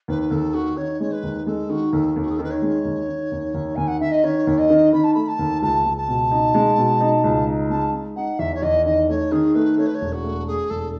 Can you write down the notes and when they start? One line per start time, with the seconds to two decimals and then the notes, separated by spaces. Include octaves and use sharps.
0.08 D#2 B4
0.30 D#2 A4
0.54 D#3 F#4
0.77 D#3 C#5
1.00 G#3 C#5
1.12 B4
1.23 D#2
1.46 G#3 A4
1.69 D#3 F#4
1.93 D#2 A4
2.16 D#2
2.22 F#4
2.29 G#4
2.36 A4
2.39 D#3 B4
2.50 C#5
2.62 G#3
2.85 D#2
3.08 D#3
3.32 D#2
3.54 D#2
3.75 D#2 G#5
3.88 F#5
4.00 D#3 E5
4.11 D#5
4.24 D#3 C#5
4.47 D#2
4.58 D#5
4.70 D#3
4.93 D#3 B5
5.03 A5
5.14 A3 B5
5.28 A5
5.39 D#2
5.62 C#2 A5
5.85 C#2
5.97 A5
6.08 B2
6.31 D#4
6.54 G#3
6.78 B2
7.01 D#4
7.24 C#2
7.47 D#4
7.70 G#3 A5
7.93 D#4
8.16 D#4 F#5
8.39 E2 E5
8.54 C#5
8.62 E2 D#5
8.85 D#3 D#5
9.09 A3 C#5
9.32 D#3 G#4
9.55 A3 B4
9.78 A3 C#5
9.86 B4
9.94 C#5
10.01 E1
10.12 F#4
10.24 A3
10.47 A3 G#4
10.70 E1 A4